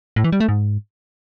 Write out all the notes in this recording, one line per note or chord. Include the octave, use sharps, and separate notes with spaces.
A2
E3
G3
A3
G#2